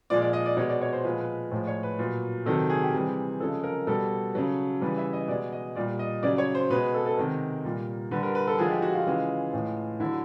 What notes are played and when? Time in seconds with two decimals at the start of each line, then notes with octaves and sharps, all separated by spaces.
0.10 A#2 F3 G#3 D5
0.22 D5
0.33 D#5
0.46 D5
0.57 B2 G#3 C#5
0.69 D5
0.81 C#5
0.93 C5
1.04 A#2 F3 G#3 B4
1.20 B4
1.51 A2 F3 G#3 C5
1.67 C#5
1.83 B4
1.99 A#2 F#3
2.46 C3 D#3 F#3 A4
2.70 G#4
2.83 G4
2.93 C3 E3 G3 G#4
3.40 C#3 F3 G#3 A4
3.64 A#4
3.87 B2 G3 A4
4.35 C#3 F#3
4.81 C#3 E3 G3 B4
4.97 E5
5.13 D#5
5.28 B2 G#3 D5
5.52 D#5
5.76 A#2 G3 D5
5.99 D#5
6.23 C#3 F#3 D5
6.38 C#5
6.55 C5
6.70 B2 G#3 B4
6.94 A4
7.06 A4
7.17 C3 D#3 G#3 A#4
7.65 A#2 G3
8.11 D3 G3 B4
8.23 A#4
8.35 B4
8.47 A4
8.58 D3 F3 G#3 G#4
8.70 G4
8.82 F#4
8.95 F4
9.06 C#3 E3 G#3
9.53 A2 E3 G#3
10.00 D3 F#3 E4